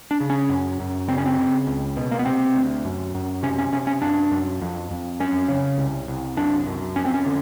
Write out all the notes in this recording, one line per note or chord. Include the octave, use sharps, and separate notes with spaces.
D4
C#3
C#4
F#2
F#2
C#3 C4
C#4
C4
C#3
C#2
B2
A#3
B3
C3 C4
D2
F#2
F#2
C3 C#4
C#4
C3 C#4
C#4
F#2 D4
F#2
F2
F2
F#2 C#4
C#3
C2
C2
F#2 D4
F#2
F2 C#4
C4
C#4
D3